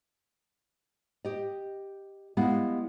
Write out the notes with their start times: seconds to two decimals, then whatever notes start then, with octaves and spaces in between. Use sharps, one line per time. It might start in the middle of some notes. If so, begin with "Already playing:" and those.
1.25 G4 D#5
2.37 G3 G#3 B3 E4 D#5 F5